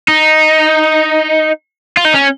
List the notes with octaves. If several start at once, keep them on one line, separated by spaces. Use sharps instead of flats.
D#4
F4
D#4
C#4